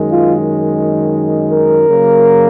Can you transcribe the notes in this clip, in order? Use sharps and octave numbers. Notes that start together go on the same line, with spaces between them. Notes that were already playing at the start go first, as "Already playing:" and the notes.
Already playing: F#2 D#3 G#3
F4
A#4
C#3 F#3 A#3